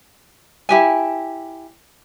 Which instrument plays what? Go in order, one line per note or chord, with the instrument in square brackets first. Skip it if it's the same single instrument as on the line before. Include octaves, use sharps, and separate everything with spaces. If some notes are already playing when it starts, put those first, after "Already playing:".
[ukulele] E4 G4 G#5